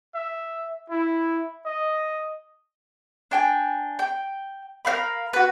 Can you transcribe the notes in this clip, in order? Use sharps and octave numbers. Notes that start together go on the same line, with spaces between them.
E5
E4
D#5
D4 G5 G#5
G5
A#4 C5 F5 B5
F#4 B4